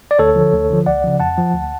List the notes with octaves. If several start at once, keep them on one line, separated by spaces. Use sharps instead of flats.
D5
D2 A4 C#5
D3 F3
D2
D3 F3
C#2 D5 F#5
C#3 F3
F2 F#5 A5
F3
D2